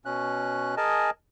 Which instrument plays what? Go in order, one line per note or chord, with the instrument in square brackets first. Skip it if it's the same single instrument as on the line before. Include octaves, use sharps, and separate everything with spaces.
[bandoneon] B2 C#4 F#6
G#4 A#4 D#5 G#5 A5